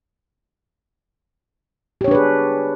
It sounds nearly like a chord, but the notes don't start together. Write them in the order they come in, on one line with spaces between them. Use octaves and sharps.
G4 C#5 D4 B4 G#4